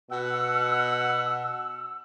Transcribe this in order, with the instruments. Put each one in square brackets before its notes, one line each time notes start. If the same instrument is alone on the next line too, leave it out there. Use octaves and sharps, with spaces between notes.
[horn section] B2 F#5 [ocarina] E6